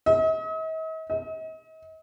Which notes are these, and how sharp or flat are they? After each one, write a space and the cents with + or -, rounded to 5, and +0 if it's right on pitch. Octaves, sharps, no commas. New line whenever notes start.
D#5 +45
D#5 +40